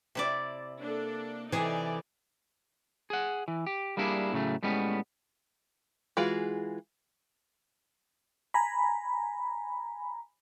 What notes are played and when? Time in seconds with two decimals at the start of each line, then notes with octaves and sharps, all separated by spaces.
0.15 C3 E4 D5
0.80 A#3 D4 A4
1.52 C3 E3 D#4 G#4 A4 D5
3.10 G#4 F#5
3.48 E3
3.67 G4
3.97 G3 A#3 D4 E4 F4 G#4
4.33 A2 C#3 F#3 A3
4.63 A2 G3 G#3 B3 C#4
6.17 E3 G#3 F4 F#4 G#4
8.54 G#5 A#5 B5